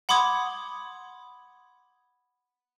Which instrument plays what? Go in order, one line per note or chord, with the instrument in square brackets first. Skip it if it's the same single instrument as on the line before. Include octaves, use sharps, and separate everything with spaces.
[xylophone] F#5 B5 C6 D6 D#6 G#6